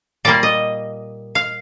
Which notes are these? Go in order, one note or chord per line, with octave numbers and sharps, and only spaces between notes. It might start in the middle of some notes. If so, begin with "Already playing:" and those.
A#2 G3 A#3 D5
D#5
F5